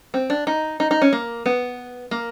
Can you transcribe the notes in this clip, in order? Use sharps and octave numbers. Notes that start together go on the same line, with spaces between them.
C4
D4
D#4
D#4
D#4
C#4
A#3
B3
A#3